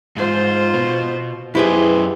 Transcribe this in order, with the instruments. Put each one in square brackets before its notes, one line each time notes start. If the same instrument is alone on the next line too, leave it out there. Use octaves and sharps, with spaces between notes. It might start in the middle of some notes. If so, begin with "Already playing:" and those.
[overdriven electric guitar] G#2 [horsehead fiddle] F4 C5
[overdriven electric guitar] B2
[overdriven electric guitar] F#2 C5 [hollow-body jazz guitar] E4 G4 G#4 [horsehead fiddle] B4